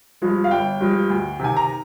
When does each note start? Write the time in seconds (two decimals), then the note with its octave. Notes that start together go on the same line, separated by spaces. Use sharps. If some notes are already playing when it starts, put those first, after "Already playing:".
0.22 G2 F3 G#3
0.44 F5
0.51 G1 G5
0.81 G2 F3 G#3
1.10 D2
1.39 C3 D#3 G#5
1.57 A#5